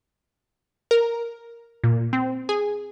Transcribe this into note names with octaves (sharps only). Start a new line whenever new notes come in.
A#4
A#2
C4
G#4